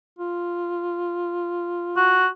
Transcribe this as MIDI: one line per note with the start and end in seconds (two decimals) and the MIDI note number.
0.18 2.31 65
1.97 2.27 66